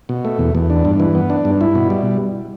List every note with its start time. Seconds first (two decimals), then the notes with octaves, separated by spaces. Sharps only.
0.09 B2
0.25 A3
0.39 E2
0.55 E2
0.70 D4
0.85 G2
1.00 E3
1.15 B3
1.30 D4
1.45 G2
1.61 E4
1.75 B2
1.90 G3